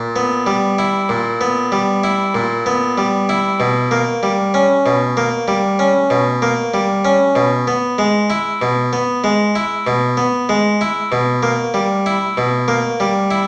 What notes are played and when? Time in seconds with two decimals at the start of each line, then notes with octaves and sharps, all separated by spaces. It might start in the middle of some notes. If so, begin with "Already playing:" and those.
Already playing: A#2
0.16 B3
0.47 G3
0.79 E4
1.09 A#2
1.41 B3
1.72 G3
2.04 E4
2.35 A#2
2.66 B3
2.98 G3
3.29 E4
3.60 B2
3.91 A#3
4.23 G3
4.54 C#4
4.86 B2
5.17 A#3
5.48 G3
5.79 C#4
6.10 B2
6.42 A#3
6.74 G3
7.05 C#4
7.36 B2
7.68 B3
7.98 G#3
8.30 E4
8.62 B2
8.93 B3
9.24 G#3
9.55 E4
9.87 B2
10.17 B3
10.49 G#3
10.81 E4
11.12 B2
11.43 A#3
11.74 G3
12.06 E4
12.37 B2
12.68 A#3
13.00 G3
13.31 E4